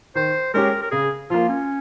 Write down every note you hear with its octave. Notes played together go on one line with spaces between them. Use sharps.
D#3 C5
G#3 C#4 G4 A#4
A#4
C#3 G#4
F3 A#3 F4
C#4